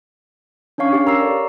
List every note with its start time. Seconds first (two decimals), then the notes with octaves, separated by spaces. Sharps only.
0.78 C#4 D4 C#5 F5 C#6
0.93 G4 C#5 F5
1.06 A#4 A#5 E6 C7
1.19 A4 D5 C#6